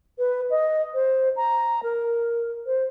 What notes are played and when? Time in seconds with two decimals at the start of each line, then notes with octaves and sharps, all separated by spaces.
0.18 B4
0.50 D#5
0.94 C5
1.36 A#5
1.83 A#4
2.66 C5